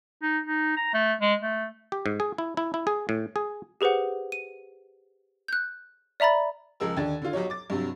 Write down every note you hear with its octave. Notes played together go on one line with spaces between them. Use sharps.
D#4
D#4
A#5
A3
G#3
A3
G4
G#2
G#4
E4
E4
E4
G#4
A2
G#4
G4 G#4 B4 C5 F#5
D#7
F#6 G6
D5 E5 A#5 B5 A6
C#2 F3 G#3 A#4 E6
D#2 D3 D4 G#6 A6
D3 F4
B1 F#3 G4 C#5
D6 A6
G2 C3 F#3